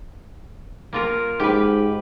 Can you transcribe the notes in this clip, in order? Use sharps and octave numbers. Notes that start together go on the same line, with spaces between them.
A#3 F4 A#4
G#2 G4 B4